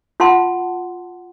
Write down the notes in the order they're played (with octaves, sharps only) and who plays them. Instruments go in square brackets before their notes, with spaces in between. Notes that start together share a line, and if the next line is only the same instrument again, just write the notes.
[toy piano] F4 F#5 A5 C6